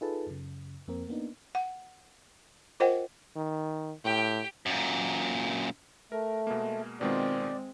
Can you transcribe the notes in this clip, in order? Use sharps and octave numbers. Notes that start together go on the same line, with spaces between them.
D#4 F4 G#4 A4 B4 A5
F#2 C#3
F2 A#3 C4 A#4
A#3 B3 D4 D#4
F#5
F4 A#4 C5 D#5 F#5 G5
D#3
A2 G4 G5
F#2 A#2
A3 A#4
B2 G#3 A#3
B2 D#3 G#3 C4 F4 D5